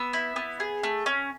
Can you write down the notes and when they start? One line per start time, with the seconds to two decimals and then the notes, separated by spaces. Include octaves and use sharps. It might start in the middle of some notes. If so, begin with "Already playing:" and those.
Already playing: B3 E6
0.13 E4
0.36 B3
0.60 G#4
0.83 A3
1.06 C#4